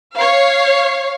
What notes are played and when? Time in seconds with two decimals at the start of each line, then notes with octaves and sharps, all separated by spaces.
0.15 C#5 F5